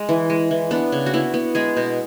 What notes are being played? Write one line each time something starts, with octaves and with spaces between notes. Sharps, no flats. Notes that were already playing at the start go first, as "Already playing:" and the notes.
Already playing: G#3
E3
G#3
E3
B3 D4
C#3
F#4
B3 E4
B3
G#3 G#4
B2